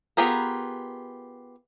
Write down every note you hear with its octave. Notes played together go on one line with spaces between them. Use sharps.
B3 F4 G4 G#4 A#4